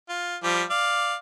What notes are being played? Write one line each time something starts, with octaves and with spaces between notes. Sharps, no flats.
F4
F3 G3 G4
D5 F5